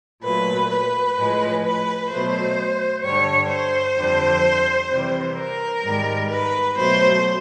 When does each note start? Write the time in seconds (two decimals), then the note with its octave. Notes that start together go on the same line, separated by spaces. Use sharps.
0.22 A#2 F#3 A3 B4
0.70 B4
1.16 A2 F3 G#3
1.63 B4
2.10 B2 F#3 A3 C5
3.02 G2 D3 G3 C#5
3.49 C5
3.96 F2 D3 G3
4.89 C3 E3 G3
5.37 A#4
5.83 G#2 D#3 G3
6.29 B4
6.76 B2 F#3 A3 C5